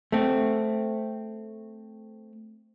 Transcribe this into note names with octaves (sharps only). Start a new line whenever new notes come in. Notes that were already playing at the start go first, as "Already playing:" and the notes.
A3 C4